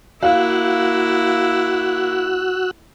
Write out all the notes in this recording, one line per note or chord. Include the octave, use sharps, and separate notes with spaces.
A#3 E4 F#4 F5 E6 F#6